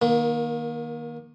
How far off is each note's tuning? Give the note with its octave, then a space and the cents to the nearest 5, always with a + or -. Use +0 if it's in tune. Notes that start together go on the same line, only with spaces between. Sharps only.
D#3 +0 A#3 +30